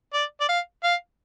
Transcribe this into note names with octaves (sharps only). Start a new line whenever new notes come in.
D5
D5
F5
F5